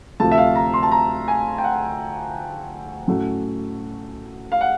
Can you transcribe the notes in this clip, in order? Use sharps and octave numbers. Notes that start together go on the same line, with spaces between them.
D2 C3 F3 A3 A5
E5
F5
A#5
C6
A5
A#5
G#5
G5
F#5
A2 F#3 A3 C#4
F5
F#5